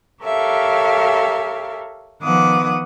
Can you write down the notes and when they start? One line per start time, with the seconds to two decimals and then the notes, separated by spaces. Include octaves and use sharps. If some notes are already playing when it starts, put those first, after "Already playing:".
0.23 G4 A4 A#4 C#5 E5 F5
2.22 D#3 F3 B3 F#5 D6 D#6